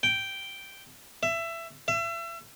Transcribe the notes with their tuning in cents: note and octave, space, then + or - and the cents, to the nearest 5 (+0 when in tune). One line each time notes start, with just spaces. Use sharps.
G5 -5
E5 +20
E5 +35